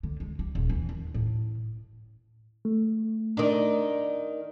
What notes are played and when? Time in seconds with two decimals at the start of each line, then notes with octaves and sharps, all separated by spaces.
0.03 D3
0.20 G#3
0.39 G3
0.55 D#1
0.70 E3
0.89 D#2
1.14 A2
2.65 A3
3.37 D#3 D4